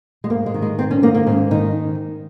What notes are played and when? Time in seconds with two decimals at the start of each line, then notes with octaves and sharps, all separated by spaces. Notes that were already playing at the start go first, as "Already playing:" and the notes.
0.24 G#3
0.30 G#2 A#3
0.46 G#3
0.54 D#3
0.62 G#3
0.78 G#2 C4
0.91 C#4
1.02 D#3 A#3
1.15 A#3
1.26 G#2 C#4
1.51 D#3 D#4